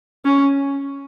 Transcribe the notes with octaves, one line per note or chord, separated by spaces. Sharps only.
C#4